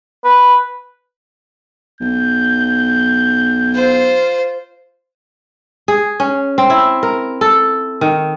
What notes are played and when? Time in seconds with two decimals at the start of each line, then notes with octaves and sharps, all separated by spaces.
0.24 B4
2.01 B1 G6
3.74 F4 C5
5.88 G#4
6.20 C#4
6.58 C4
6.70 E4
7.03 A#4
7.41 A4
8.01 D#3